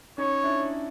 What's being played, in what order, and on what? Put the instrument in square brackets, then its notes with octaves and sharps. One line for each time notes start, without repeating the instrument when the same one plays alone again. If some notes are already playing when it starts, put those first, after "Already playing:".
[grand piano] C#4 D#4 [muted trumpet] C#5
[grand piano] D4 E4